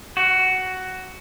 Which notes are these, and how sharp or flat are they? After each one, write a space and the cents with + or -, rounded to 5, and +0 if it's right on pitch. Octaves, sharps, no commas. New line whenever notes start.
F#4 +10